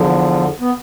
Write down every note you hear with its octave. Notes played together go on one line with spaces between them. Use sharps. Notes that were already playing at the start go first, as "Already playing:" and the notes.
Already playing: E2 D3 F3
B3